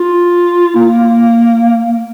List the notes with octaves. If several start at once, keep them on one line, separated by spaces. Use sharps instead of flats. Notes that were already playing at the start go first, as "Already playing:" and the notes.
Already playing: F4
A#3